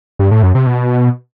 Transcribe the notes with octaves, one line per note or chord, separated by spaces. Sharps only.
G2
A2
F#2
C3
B2